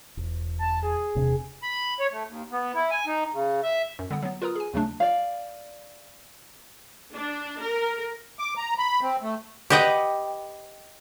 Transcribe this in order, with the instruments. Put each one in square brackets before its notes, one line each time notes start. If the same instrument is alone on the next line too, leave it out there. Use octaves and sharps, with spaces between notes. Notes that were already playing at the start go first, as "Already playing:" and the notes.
[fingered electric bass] E1
[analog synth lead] A5
G#4
[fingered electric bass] E1 C3 D4
[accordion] B5
C#5
A3
D#2
B3
E4
G#5
D#4
C#3
E5
[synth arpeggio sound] F#2
D3 G3 B3 F#5
F#3 B3
F4 A#4 B4 A#5 D#6 F6
G#4 G#5
D#2 C#3 F#3 A3 D4
[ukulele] D5 F5
[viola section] D4
A#4
[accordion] D6
A#5
B5
C4
A3
[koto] G4 B4 D#5 F#5 G5